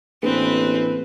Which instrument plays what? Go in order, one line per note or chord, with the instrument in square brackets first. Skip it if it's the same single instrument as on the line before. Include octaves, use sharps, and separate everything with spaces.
[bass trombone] A1 [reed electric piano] A#3 D4 G#4 [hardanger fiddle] C4 [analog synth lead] B4